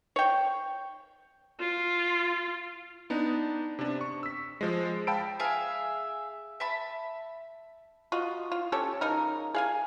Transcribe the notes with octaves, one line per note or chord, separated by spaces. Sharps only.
C#5 G5
F4
B3 D4 D#4
C3 D4
C#6
E6 B6
F3 G#3
F5 G5 A5 B5 E6 D7
G#4 E5 F5
E5 A5 B5
F4 F#4 D#5
F4
C#4 G4 A4 C#5
C#3 D#4 A#4
G#4 F5 G#5